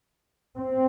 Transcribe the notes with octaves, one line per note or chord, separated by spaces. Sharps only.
C4